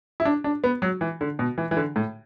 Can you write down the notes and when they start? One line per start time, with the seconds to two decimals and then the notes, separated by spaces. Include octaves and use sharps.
0.20 E4
0.25 D4
0.44 D4
0.64 B3
0.82 F#3
1.01 E3
1.21 D3
1.39 B2
1.58 E3
1.71 E3
1.77 D3
1.96 A2